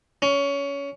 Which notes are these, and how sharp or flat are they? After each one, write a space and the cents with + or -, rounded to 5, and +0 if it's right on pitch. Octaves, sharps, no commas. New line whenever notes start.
C#4 +20